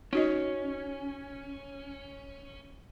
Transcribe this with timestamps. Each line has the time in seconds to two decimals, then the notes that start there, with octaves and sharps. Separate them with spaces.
0.13 C#4 D#4 F#4 D#5